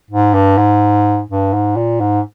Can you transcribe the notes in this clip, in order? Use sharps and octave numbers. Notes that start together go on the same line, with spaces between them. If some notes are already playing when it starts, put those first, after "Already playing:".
G#2
G2
G#2
G2
G#2
A#2
G#2